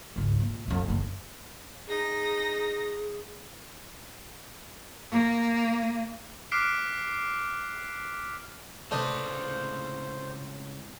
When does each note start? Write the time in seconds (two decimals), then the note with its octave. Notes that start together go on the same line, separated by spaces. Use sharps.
0.16 G#1 C#2
0.40 A#2
0.68 F2 A#3
0.88 F#1 A#3
1.88 D#4 G#4 A#6
5.11 A#3
6.52 D6 F6 F#6 B6 C7 D7
8.91 C#2 A2 C3 A3 D4 B4 C5 D#5